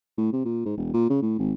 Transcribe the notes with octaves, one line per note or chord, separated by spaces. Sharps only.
A2
C3
A#2
G#2
E1
A#2
C#3
A2
G#1